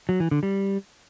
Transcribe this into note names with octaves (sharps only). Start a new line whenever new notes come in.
F#3
E3
D3
G3